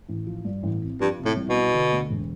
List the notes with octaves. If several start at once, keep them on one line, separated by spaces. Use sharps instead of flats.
A1
F3
G2
A1
C4
G2 F3
C3
A2
C2
B2
B3
D3
D2
E1